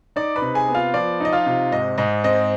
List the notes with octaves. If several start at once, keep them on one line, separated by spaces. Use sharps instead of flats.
D#4 D5 D6
B4 B5
C3
G#4 G#5
B3
F4 F5
F3 D5
D#4 D#5
F4 F5
C3
G#2 D#5
G#2 D#5
C4 D#5